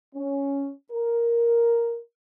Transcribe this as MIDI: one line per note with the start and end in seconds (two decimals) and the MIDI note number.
0.15 0.70 61
0.91 1.97 70